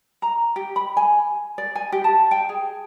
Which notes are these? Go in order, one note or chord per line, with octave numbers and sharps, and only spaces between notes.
A#5
G4
B5
G#5
D5
G#5
G4
A5
G5
G#4